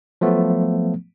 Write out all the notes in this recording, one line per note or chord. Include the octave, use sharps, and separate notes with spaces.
F3 F#3 A3 B3